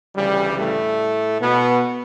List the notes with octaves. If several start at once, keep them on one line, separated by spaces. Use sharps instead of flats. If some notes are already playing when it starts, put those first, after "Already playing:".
D2 C#3 E3 G3
A2 A3
B2 B3